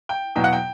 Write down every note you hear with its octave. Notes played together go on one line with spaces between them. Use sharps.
G5
E2 B2 F#3 G5
F#5
G5